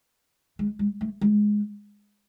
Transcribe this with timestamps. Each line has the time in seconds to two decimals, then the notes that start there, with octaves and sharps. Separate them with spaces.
0.59 G#3
0.79 G#3
1.01 A3
1.21 G#3